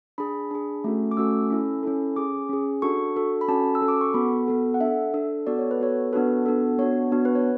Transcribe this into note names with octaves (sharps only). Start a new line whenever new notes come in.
D4 G#4 B5
D4 G#4
A3 C#4 F#4 A4
D6
A3 C#4 F#4 A4 E6
C#4 E4 A4
C#4 E4 A4
C#4 G#4 D6
C#4 G#4
D4 F#4 A4 C#6
D4 F#4 A4
B5
C#4 F#4 A4 A5
E6
C#4 F#4 A4
D6
C#6
B3 F#4 A4 B5
B3 F#4 A4
F#5
D4 A4 E5
D4 A4
B3 F#4 A4 D5
C#5
B4
B3 F#4 A4 C#5
B3 D4 F#4 A4 B4
B3 D4 F#4 A4
B3 D4 F#4 C#5
B3 D4 F#4
B4
C#5